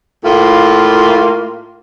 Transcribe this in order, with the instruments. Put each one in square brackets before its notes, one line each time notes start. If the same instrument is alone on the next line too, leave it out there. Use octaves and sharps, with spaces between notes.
[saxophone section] A2 A#3 F4